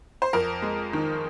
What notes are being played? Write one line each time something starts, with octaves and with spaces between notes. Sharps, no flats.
C5
F2 A#4
G#3
D#3